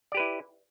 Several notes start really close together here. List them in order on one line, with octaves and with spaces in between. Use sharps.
D5 G4 B4 E4